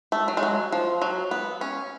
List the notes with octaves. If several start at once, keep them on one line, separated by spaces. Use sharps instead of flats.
A3
F#3
G#3
F#3
F3
F#3
B3
C#4